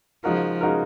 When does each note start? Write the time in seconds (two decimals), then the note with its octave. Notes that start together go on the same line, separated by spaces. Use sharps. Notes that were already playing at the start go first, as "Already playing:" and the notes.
0.24 C#3 F3 G#3 D#4 F#4 A#4
0.61 C#3 G#3 D#4 F#4 A#4